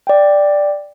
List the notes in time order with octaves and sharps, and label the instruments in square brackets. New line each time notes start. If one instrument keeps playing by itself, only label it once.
[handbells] D5 G5